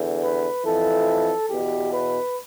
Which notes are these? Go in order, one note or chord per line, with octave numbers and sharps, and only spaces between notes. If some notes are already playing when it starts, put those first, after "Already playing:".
Already playing: E2 D3
B4
F2 E3 A4
E2 B2 G4
B4